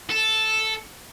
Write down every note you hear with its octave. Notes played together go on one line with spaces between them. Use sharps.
A4